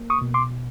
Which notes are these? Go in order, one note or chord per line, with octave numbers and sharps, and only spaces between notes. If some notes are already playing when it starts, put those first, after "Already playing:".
Already playing: A#3
C#6 D#6
B2
C6 D6